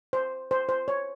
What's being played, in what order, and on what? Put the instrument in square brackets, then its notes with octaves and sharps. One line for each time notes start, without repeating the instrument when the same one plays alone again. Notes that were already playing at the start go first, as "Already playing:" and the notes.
[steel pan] C5
C5
C5
C#5